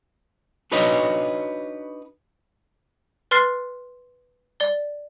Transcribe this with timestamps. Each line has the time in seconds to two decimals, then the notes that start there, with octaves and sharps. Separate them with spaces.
0.71 D4 D#4 F#4 B4 C#5 D#5
3.31 B4 C6 F6 A6 C7
4.60 D5 G7